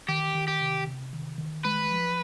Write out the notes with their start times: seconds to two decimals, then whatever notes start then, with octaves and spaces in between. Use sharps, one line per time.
0.08 D#3 G4
0.35 D#3
0.48 G4
0.61 C3
0.87 C3
1.13 D#3
1.38 D#3
1.65 G#3 B4
1.91 F3